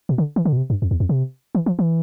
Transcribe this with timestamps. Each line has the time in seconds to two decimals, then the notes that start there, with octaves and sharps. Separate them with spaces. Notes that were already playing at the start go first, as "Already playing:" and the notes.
0.09 B2
0.18 D3
0.36 E3
0.45 D3
0.53 B2
0.57 C3
0.70 G2
0.82 F2
0.91 E2
1.00 F2
1.09 C3
1.55 E3
1.66 F3
1.79 E3